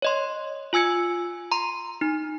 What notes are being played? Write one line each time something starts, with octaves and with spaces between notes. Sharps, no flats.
C#5 D#5 C6
F4 G#5 E6 G#6 C#7
A#5 C6
D#4